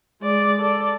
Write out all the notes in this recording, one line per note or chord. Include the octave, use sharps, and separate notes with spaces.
G#3 D5
A4 D5